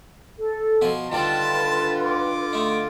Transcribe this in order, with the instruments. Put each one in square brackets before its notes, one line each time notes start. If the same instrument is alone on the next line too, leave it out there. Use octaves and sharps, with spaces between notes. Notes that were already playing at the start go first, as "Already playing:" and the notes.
[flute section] A4
[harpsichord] B2 F3 G#5
[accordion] D3 F4 [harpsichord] D#3 G3 D5 [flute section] B4 [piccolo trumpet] A5
[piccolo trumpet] D6
[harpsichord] A3 D#4